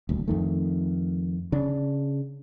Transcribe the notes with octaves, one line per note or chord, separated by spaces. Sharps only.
D#1 D2
F2 D#3 A3
C#3 D4